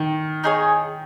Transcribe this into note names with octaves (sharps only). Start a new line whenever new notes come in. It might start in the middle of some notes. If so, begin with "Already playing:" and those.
Already playing: D#3
D#4 G#4 C#5